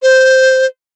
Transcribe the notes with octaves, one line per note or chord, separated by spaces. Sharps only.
C5